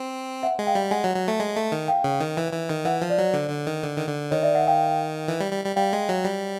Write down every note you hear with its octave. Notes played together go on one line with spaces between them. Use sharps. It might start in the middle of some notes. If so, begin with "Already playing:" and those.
Already playing: C4
E5 F#5
G#3
F5 G5
G3
G#3 F#5 G#5
F#3
F#3
A3
G#3
A3
D#3
F5 G5
C#3
D#3
E3
E3
D#3
E3 E5 F#5
F3
C5 D5
F#3
D3
D3
D#3
D3
D#3
D3
D#3 C#5 D#5
D5 E5
E5 F#5
F5 G5
E3
G3
G3
G3
G3 F5 G5
G#3
F#3
G3